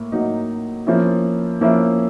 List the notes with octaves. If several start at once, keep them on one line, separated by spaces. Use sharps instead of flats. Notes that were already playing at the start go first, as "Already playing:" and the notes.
Already playing: A2 A#3
A2 F#3 A#3 D#4
F3 A#3 C#4 E4
F3 A#3 C#4 E4